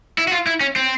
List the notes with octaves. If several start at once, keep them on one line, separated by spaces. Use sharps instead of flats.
E4
F#4
F4
E4
C#4
C4